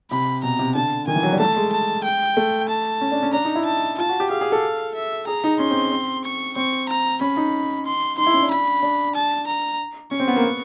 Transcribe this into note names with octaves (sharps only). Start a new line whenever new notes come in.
C3 B5
B2 A#5
C3
D3 A5
D#3 G#5
E3
F#3
G3
A3 A5
G#3
A5
G5
A3
A5
C#4
D4
C#4
D4 A#5
D#4
E4
A5
F4 A5
F#4
G4
G#4 F5
G#4
A4
E5
G#4 A#5
D#4
C#4 C6
C4
C4
C#6
C4 C#6
A#5
C#4 B5
D#4
C6
D#4 C6
E4
C#4
D4
B5
D4
A5
A#5
C#4 C#6
C4
B3
A#3
B3